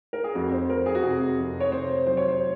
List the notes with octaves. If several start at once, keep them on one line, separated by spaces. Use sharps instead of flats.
A#4
G#4
F2 F#4
C5
F2 A#4
G#4
F#4
C3 G#4
F2
C#5
C3 C5
F#3 C5
C#5
C5